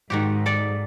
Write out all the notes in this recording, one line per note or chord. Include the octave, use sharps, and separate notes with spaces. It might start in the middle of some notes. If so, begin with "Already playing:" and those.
G#2 D#3 F#4 G4
A4 D5